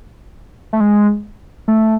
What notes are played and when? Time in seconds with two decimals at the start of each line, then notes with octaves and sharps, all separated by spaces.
0.73 A3
0.80 G#3
1.68 A3